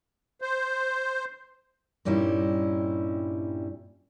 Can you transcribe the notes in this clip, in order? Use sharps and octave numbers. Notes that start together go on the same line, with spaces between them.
C5
G2 A#2 G3 C#4 D#4 E4